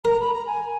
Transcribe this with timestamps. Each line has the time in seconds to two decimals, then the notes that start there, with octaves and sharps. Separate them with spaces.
0.05 A#4 A#5
0.20 B5
0.33 A#5
0.47 G#5